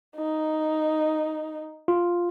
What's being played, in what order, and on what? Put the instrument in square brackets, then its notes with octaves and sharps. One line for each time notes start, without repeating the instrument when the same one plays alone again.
[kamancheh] D#4
[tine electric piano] F4